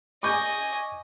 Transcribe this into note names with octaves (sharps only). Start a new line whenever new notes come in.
D#5 G#5 C#6 D6 G6